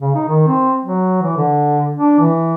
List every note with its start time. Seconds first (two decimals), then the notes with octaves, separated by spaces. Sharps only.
0.01 C#3
0.15 D#4
0.29 D#3
0.47 C4
0.85 F#3
1.22 E3
1.37 D3
1.97 D4
2.20 E3